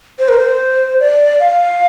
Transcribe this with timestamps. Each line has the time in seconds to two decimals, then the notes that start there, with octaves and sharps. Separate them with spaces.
0.19 C5
0.29 A#4
0.39 C5
1.00 D5
1.40 F5